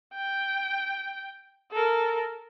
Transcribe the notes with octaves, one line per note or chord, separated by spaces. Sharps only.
G5
A4 A#4